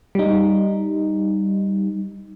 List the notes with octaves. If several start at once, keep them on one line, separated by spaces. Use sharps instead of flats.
G3 D#4